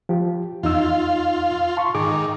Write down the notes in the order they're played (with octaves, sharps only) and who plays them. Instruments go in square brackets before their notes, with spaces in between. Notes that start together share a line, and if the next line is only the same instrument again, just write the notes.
[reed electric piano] F3 G4
[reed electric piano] E2 D#4 E6 [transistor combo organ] F4
[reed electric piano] A5 C6 C#6
[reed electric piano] G#2 G#4 D6 [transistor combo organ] D#3